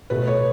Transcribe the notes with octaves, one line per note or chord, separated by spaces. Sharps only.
B2 A3 B4
C#5